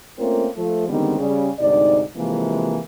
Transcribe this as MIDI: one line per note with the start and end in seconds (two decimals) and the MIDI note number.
0.19 0.47 57
0.19 0.47 58
0.19 0.47 60
0.19 0.47 61
0.19 0.47 65
0.19 0.47 70
0.56 0.87 53
0.56 0.87 57
0.88 1.17 50
0.88 1.17 51
0.88 1.17 55
0.88 1.17 56
0.88 1.17 59
0.88 1.17 60
1.19 1.50 49
1.19 1.50 55
1.59 2.02 38
1.59 2.02 44
1.59 2.02 48
1.59 2.02 63
1.59 2.02 74
2.16 2.79 48
2.16 2.79 52
2.16 2.79 53
2.16 2.79 56
2.16 2.79 58